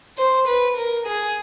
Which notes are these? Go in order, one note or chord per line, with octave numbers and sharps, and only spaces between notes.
C5
B4
A#4
G#4